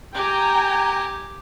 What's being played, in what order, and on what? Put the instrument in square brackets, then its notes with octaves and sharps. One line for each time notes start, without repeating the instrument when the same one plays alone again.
[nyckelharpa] G4 [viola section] G5 G#5 A#5